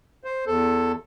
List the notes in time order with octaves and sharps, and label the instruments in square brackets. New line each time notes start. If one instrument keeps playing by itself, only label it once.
[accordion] C5
E2 A4